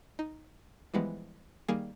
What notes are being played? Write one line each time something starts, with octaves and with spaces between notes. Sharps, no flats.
D#4
E3 F3 G3 G#3 B3
D#3 G3 A#3 G#4